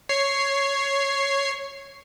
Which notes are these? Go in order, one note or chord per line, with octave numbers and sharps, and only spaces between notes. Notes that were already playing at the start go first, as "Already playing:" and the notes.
C#5 C7